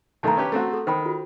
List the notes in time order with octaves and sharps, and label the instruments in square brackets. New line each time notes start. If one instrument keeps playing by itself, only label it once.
[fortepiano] B1 D#3 A3 [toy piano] A5 A#5
[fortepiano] C#4 G4 B4
A3 C4 F#4
[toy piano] A4
[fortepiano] D#3 [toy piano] C5 G5 B5
[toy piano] F4 F#4